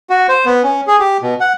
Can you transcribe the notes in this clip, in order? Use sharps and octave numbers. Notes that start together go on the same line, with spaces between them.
F#4
C5
B3
C#4
G#4
G4
B2
F#5